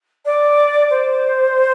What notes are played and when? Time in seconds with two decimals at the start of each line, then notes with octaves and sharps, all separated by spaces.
0.25 D5
0.90 C5